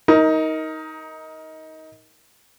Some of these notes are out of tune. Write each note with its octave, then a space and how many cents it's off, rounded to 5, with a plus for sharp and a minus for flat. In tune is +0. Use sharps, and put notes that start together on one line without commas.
D#4 +20 A#4 +0